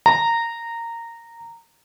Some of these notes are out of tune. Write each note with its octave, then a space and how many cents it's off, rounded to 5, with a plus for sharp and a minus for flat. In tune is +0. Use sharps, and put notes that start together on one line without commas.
A#5 -15